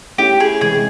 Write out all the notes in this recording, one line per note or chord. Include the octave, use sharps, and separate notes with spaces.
A3 C#4 E4 G4
G#4
C3 E3 G#3 G#4